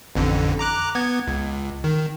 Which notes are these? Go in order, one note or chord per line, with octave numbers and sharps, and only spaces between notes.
A1 F2 D3
A#5 D6 F#6
B3 G#6
C#2
D#3